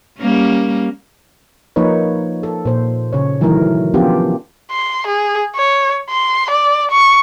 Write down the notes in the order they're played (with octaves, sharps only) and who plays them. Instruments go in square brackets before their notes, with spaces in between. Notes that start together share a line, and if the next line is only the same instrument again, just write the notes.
[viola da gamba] G3 A#3 C#4
[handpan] F3 A#3 D#4 B4 C#5
A4
A#2 C5
C#3 C#5
D#3 E3 F#3 A3 A#4
F3 B3 C#4 D4 F4 G4
[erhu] C6
G#4
C#5
C6
D5
C#6